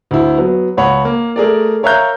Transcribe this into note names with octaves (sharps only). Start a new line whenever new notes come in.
D2 E4
F#3 B3
C#2 C#5 F#5 B5
A#3
A3 G#4 A#4 D5
A#4 C#5 E5 F5 A#5 G6